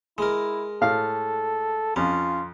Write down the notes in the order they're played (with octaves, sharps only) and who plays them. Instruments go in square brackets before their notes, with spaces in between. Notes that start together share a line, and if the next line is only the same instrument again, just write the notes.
[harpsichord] G#3 A#4 [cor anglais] E4
[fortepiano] A2 F5 [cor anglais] A4
[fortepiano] F2 [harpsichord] C#4 [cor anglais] F4